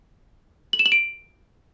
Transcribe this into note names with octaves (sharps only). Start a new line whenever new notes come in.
F#7
E7
F#7
D7